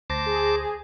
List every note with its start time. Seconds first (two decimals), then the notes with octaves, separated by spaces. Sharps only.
0.10 D2 C5 A5 D6 A#6
0.26 G#4